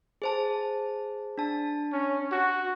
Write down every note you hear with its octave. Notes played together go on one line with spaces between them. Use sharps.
G#4 C5 A5
D4 A5
C#4
F#4